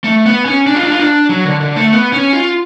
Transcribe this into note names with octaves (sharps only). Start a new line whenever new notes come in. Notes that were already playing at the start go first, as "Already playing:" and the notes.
A3
B3
C#4
D4
F4
D4
F4
D4
F#3
D3
D3
A3
B3
C#4
F4